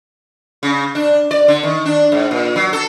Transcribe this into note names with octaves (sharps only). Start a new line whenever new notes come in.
C#3
D4
D5
D3
D#3
D4
G#2
A#2
F#3
A4